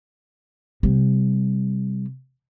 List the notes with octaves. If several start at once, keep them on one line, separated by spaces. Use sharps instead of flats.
C3 G3